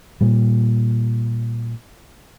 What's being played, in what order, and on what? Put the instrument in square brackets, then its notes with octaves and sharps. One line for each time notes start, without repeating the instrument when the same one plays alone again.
[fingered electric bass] A#2 G3